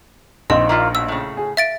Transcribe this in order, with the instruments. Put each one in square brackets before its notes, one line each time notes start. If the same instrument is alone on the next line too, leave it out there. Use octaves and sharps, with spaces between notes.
[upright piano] A#1 D#4 [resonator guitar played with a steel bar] C4 [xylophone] D#5
[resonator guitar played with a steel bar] A#3 E4 F4
[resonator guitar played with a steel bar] B2 [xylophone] E6
[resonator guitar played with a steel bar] A2 C#3
[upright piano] G#4
[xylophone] E5 A6 D7 [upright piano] F5